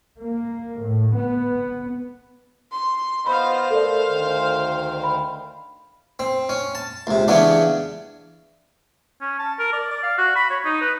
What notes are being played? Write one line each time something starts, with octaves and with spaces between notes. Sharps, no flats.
A#3
A2
B3
C6
B3 F4 C5 D#5 F5 B5
A2 A3 A4 A#4 D5
D2 D#3
B5
C4
C#4
A5
C#2 C3
C#3 E3 B3 C#4 D4
C#4
A5
A#4
D5
D5
F5
F#4
B5
C#5
D#4
B4